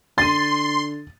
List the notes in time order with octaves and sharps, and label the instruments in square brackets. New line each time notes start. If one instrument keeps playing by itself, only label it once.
[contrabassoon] D3 [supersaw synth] C6 [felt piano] A6 D#7